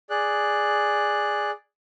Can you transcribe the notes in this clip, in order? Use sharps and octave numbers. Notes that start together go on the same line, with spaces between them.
G#4 D5 F#6